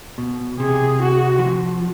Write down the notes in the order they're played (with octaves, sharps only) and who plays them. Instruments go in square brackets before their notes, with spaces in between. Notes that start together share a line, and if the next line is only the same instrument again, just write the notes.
[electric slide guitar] B2
[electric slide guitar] C3 [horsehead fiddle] G#4
[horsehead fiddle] F#4
[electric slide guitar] E3
F3